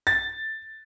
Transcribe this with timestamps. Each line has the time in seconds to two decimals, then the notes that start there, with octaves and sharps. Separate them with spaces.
0.07 A6